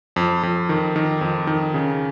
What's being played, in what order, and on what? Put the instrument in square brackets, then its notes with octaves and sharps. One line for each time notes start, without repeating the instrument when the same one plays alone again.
[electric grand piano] F2
F2
D#3
D#3
F2
D#3
C#3